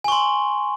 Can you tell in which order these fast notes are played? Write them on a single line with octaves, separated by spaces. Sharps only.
G#5 C#6 C6